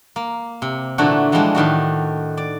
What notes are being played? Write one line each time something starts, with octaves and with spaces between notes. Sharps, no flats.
A#3
C3
A#2 D3 E3 A3 D4 F#4
E3 F3 G3 G#3 D4
A2 D#3 D4 F#4
D5